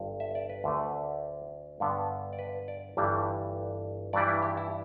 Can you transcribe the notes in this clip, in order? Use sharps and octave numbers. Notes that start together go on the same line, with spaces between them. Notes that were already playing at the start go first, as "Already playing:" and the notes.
Already playing: G1 G2
E5
D5
B4
D2 D3 A3
G2 D3 B3
D5
B4
D5
G1 G2 E3 G3
G2 E3 G3 D5
E4
G4
E4